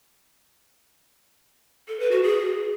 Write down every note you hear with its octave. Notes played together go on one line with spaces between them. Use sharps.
A4
B4
F#4
G#4